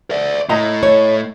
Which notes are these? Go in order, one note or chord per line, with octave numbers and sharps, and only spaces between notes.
D5 E5
A2 E4 D#5 A#5
C#5